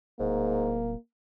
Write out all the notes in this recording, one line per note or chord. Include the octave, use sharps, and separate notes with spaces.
D1 G#2 A#3